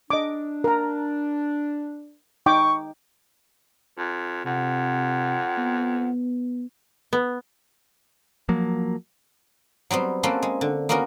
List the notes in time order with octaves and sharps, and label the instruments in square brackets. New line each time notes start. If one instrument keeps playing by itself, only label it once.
[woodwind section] D4 [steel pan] D#5 D6
[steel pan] A#4 A#5
[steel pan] D#4 G5 D6 [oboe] C#6
[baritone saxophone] F2
[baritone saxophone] F2 [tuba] C3 [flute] F#5
[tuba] B3
[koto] B3
[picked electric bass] F3 F#3 A#3
[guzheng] F#3 G3 B3 C4
A#3 C4 C#4 A4 B4
G#3
D3
A#3 B3 C#4 F#4 A#4